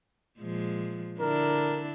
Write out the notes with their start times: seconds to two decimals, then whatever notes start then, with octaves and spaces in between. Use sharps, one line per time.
0.39 A#2 F3 G#3
1.19 D3 D4 E4 A#4